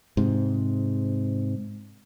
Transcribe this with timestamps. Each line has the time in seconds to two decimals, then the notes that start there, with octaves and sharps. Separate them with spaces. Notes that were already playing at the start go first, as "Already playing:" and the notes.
0.17 G#2 C3